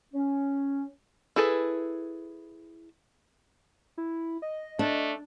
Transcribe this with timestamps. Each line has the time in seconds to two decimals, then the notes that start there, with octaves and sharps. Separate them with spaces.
0.14 C#4
1.36 E4 G#4 A4 B4
3.98 E4
4.42 D#5
4.79 A3 D4